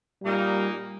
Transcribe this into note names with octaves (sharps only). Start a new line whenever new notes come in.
A#2 G3 A#3 D#4